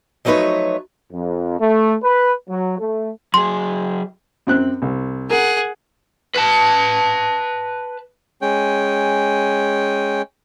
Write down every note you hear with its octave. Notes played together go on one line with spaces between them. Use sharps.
F3 F#3 A3 D#4 B4 C#5
F2
A3
B4
F#3
A3
F#3 G#4 C6
F#2 C4 F#6
C2
G#4 A#4 F#5
B4 A5
G#3 C#4 G5